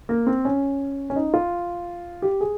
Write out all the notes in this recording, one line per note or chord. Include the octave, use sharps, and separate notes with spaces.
A#3
C4
C#4
C#4
D#4
F4
G4
G#4